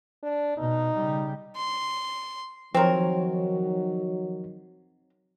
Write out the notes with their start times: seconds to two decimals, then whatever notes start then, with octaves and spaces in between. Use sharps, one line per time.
0.23 D4
0.58 B2 D#4
0.95 C#3 G3
1.56 C6
2.75 D#3 F3 F#3 C4 A#4 C#5